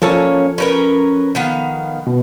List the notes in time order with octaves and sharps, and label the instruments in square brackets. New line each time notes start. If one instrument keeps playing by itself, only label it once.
[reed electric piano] F3 A4 [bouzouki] A#3 C#4 C#5
[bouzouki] C#4 A#4 B4
D#3 B3 F5
[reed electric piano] B2